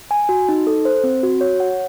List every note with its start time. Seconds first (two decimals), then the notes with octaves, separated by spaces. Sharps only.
0.11 G#5
0.29 F#4
0.49 D#4
0.67 A4
0.85 C5
1.04 C4
1.23 F#4
1.41 C#5
1.60 F#5